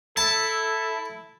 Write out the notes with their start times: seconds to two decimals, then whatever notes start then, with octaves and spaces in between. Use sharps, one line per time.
0.17 E4 A4 A5